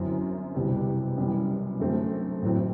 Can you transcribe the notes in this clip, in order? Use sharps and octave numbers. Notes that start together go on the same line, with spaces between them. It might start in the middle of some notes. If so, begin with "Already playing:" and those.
Already playing: G1 F#2 F#3 C4 E4
C2 B2 G3 C4 G4
F#2 E3 G3
F#2 D3 F#3 A3 C4
A1 A2 F#3 C4